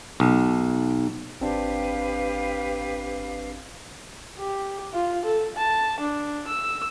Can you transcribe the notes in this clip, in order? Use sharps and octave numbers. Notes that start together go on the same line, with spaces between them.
B1
G#1 C4 D4 G4 B4 F5
G4
F4
A4
A5
D4
E6